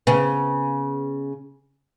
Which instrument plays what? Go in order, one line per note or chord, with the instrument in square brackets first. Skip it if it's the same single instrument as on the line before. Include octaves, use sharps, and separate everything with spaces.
[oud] C#3 B3